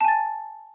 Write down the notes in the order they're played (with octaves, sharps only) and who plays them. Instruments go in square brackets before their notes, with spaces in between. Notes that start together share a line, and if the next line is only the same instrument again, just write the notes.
[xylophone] A5
G#5
A6